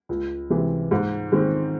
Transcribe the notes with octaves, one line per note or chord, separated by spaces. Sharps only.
C#2
C3 E3 G#3
G#2
D#3 G#3 C4